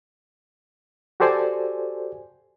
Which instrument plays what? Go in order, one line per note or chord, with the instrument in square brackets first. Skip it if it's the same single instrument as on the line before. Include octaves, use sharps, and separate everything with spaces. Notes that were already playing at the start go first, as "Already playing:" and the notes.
[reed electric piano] F#4 G4 A4 C5 D5 G#5